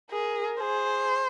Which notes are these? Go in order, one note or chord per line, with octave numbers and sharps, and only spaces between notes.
G#4 A#4
G#4 C5